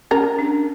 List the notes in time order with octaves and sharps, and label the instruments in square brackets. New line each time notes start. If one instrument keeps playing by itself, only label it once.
[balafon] C#4 [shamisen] A#4
[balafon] D4